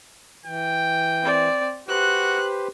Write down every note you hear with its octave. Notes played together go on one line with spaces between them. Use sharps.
E3 G5
C4 D5
F#4 G4 B4 C5 F#6